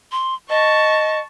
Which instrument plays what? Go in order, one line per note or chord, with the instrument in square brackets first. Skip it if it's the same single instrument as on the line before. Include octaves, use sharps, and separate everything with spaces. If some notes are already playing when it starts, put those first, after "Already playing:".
[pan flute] C6
[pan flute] D#5 [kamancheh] A5 C#6